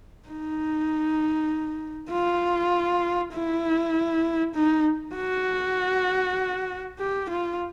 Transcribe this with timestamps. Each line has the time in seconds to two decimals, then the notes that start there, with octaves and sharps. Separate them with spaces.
0.29 D#4
2.12 F4
3.34 E4
4.55 D#4
5.16 F#4
6.99 G4
7.29 F4